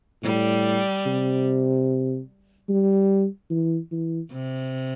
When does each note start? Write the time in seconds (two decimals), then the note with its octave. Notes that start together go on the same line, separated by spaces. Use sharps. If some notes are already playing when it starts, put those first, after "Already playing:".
0.23 A2 G3
1.06 C3
2.69 G3
3.50 E3
3.92 E3
4.32 C3